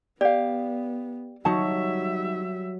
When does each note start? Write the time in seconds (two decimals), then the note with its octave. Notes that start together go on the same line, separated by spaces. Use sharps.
0.21 B3 G4 D5 F5
1.45 F#3 G3 D#4 E5 A5